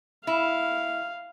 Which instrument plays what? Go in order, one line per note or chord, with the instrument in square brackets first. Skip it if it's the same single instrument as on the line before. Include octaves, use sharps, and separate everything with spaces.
[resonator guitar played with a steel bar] E4 [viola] F5